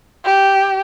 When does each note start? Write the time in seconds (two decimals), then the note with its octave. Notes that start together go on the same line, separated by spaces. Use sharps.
0.25 G4